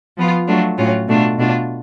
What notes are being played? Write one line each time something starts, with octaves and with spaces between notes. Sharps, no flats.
F3 B3 F4
F#3 A3 D4 F4
A2 F#3 C#4 F4
B2 A3 D4 F4
B2 A3 D4 F4